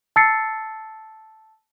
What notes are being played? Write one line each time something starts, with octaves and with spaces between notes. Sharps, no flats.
A5 E6 A6 C7 C#7